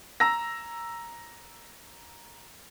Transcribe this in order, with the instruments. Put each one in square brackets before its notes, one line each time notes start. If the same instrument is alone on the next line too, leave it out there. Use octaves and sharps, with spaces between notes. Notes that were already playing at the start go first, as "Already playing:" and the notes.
[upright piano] A#5 E6 A#6